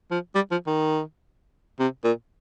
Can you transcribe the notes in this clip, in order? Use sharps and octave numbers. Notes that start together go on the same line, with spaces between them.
F3
G3
F3
D#3
C3
A#2